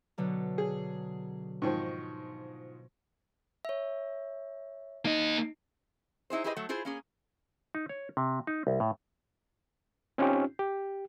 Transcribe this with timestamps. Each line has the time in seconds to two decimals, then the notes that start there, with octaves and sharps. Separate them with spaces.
0.18 B2 D3 F#3
0.58 G#4
1.62 G#2 D#3 F3 C#6 G6
3.65 C#5 E5
5.05 A#3 D#4 D#5
6.30 D#4 E4 G#4 C5
6.44 E4 G4 G#4 B4 C5 D#5
6.56 F#3 A3
6.69 E4 F4 G#4 C5
6.85 A#3 C#4 G#4
7.75 D#4
7.89 C#5
8.17 C3
8.47 D#4
8.67 C2
8.80 A2
10.18 C4 C#4 D#4 F4 G4
10.59 G4